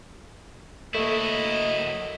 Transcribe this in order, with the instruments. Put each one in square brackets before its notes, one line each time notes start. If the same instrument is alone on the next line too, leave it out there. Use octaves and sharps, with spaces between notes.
[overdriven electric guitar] F#3 E4 [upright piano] A3 [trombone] A#3 [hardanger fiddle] D#5